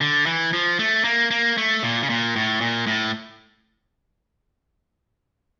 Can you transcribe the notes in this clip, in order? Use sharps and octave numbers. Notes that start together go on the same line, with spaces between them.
D3
E3
F3
A3
A#3
A#3
A3
A#2
C#3
A#2
A2
A#2
A2